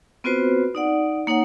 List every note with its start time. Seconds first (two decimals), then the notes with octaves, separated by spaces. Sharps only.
0.24 B3 C4 F4 F#4 B4 C5
0.75 D#4 D5 F#5
1.27 A#3 D#4 C#5 F#5